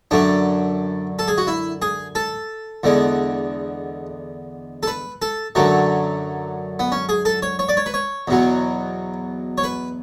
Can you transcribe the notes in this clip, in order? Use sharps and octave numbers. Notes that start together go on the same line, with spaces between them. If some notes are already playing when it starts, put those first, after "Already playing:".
F#2 D3 A3 D4
A4
G#4
F#4
E4
G#4
A4
E2 D3 G#3
A4
B4
A4
F#2 D3 F#3 A3
B3
C#4
G#4
A4
C#5
C#5
D5
C#5
B4
C#5
E2 B2 F#3
C#5
B4